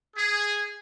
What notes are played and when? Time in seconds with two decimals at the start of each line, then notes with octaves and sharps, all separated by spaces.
0.16 G#4